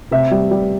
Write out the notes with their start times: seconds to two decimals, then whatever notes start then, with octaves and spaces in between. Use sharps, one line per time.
0.11 C3 E5
0.31 G3
0.51 G3